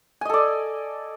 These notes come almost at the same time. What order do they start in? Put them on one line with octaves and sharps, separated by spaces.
G#5 D#5 A4 D5